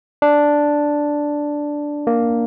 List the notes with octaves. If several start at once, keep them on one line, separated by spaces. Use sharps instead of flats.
D4
A#3